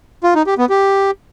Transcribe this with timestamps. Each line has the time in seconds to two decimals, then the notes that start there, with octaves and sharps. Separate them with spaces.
0.24 F4
0.35 D#4
0.47 G4
0.58 B3
0.70 G4